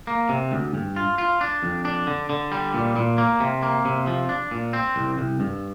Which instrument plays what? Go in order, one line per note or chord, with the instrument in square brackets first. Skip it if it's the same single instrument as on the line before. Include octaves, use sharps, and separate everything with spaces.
[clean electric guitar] A#3
C3
D2
G2
F4
F4
D4
F2
D4
D3
D3
G3
A#2
A#2
A#3
C3
A#3
C3
F3
D4
A#2
C4
C2
C2
G2